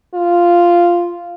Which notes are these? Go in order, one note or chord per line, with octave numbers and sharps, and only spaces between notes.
F4